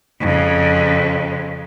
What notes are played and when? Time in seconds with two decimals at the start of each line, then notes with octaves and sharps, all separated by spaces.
0.20 F2 C#3